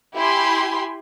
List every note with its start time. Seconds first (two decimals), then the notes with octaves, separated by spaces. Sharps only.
0.16 E4 G4 G#5 B5 C6